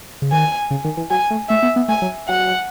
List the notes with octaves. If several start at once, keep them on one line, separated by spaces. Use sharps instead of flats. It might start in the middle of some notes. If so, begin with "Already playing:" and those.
C#3
D#3 G#5
C#3
D#3
E3
F#3 G#5
A3
A3 E5
B3
B3
A3 G#5
F#3
F#3 F#5